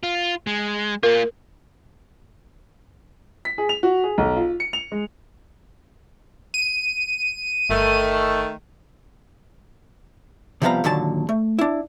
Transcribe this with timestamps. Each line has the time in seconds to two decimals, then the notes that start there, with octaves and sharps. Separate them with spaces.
0.03 F4
0.47 G#3
1.03 A#3 F4 A#4
3.45 B6
3.58 G#4
3.69 F7
3.83 F#4
4.04 G#4
4.18 B1
4.37 F4
4.60 C#7
4.73 F7
4.92 G#3
6.54 D#7
7.70 G1 D#3 A3
10.62 C3 F3 G3 B3 F5 A#5
10.84 D#2 A#2 D3 F#3 A5
11.29 A3
11.59 D4 E4